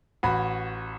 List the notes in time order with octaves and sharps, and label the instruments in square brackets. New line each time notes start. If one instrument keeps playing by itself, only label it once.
[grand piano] A1 F#4 B5